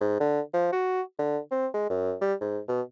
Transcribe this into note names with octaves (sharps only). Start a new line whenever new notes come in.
G#2
D3
F3
F#4
D3
C4
G#3
F#2
G3
G#2
B2